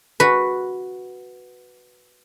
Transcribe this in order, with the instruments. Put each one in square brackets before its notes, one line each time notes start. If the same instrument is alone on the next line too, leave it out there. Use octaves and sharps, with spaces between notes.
[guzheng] F#4 B4